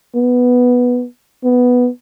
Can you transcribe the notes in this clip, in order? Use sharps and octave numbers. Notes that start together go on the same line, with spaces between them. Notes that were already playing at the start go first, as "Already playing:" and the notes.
B3
B3